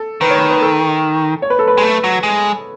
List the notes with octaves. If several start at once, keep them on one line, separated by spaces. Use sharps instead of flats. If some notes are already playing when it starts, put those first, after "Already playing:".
Already playing: A4
D#3 B4
C#5
B4
B4
A4
C#5
B4
A4
B4
G#3
A3
F#3
G#3